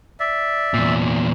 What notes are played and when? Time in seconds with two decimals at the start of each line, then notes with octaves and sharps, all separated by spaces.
0.20 D5 E5
0.74 E2 A#2